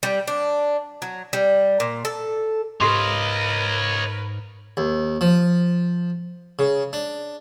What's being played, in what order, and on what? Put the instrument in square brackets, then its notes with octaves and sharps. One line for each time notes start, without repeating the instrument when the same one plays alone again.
[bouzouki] G3
D4
F#3
G3
A#2
A4
[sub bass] G#2 [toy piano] G4 C6 C#6 [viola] A#4 B4 [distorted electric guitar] C#5 D#5
[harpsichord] D#2
F3
C#3
D4